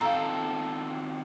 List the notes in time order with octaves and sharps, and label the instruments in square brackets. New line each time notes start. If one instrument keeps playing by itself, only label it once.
[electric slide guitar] D#3 C4 F4 [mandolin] A4 [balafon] F5 A#5